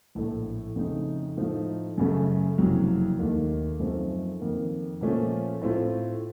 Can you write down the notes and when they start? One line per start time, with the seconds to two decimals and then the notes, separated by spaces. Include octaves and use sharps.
0.15 A#1 A2 A3
0.76 F2 C#3 A3 D#4
1.37 A2 F3 A3 D#4
1.98 F#2 C#3 A3
2.58 F#1 F2 C3 F#3
3.19 D#2 D#3 A3
3.80 F#2 F3 A3 C4 D#4
4.41 F2 D#3 A#3
5.01 A#2 F3 A3 C#4
5.62 A2 A3 C4 F4